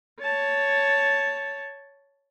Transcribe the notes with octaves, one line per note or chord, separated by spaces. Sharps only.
C#5 A5